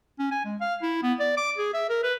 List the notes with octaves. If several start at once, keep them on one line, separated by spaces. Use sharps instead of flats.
C#4
G#5
G#3
F5
E4
B3
D5
D6
G#4
E5
A#4
B4